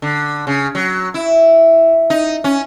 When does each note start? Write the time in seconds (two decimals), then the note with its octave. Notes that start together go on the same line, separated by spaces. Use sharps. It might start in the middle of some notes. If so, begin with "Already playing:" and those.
0.02 D3
0.47 C#3
0.75 F#3
1.14 E4
2.10 D#4
2.44 C#4